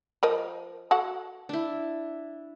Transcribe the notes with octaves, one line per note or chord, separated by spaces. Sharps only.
F3 A#4 D#5
F#4 A4 F#5
D4 E4